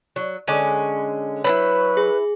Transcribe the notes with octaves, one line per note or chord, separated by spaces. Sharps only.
F#3
D3 G#3 C#4 G#5 D6
F#3 E4 A4 B4 C#5 B5
G#4